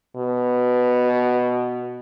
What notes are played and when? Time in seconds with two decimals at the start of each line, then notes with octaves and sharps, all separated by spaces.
0.17 B2